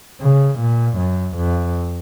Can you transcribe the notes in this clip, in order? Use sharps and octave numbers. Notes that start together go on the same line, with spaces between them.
C#3
A#2
F#2
F2